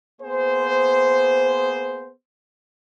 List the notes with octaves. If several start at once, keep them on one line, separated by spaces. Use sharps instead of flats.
A#3 B3 G#4 C5